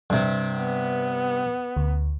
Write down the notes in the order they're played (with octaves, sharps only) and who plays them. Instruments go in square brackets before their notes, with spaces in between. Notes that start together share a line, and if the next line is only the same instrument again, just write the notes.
[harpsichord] G2 C3
[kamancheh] B3
[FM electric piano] D2